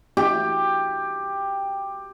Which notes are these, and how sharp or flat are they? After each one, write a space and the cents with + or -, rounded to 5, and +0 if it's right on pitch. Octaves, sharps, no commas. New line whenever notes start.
G4 +10